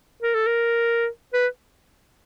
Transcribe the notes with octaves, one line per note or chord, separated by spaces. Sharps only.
A#4
A4
A#4
B4